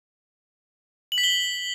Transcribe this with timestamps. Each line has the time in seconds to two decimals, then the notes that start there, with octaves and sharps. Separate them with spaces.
1.12 F#7
1.18 B6
1.24 G7